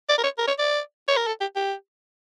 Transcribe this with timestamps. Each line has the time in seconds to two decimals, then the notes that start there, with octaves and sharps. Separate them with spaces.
0.09 D5
0.18 A#4
0.23 C#5
0.38 A#4
0.48 C#5
0.58 D5
1.08 C#5
1.16 A#4
1.27 A4
1.41 G4
1.56 G4